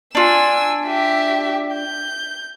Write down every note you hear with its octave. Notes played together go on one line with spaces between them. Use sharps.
D4 F4 G#5 E6
G4 E5
G6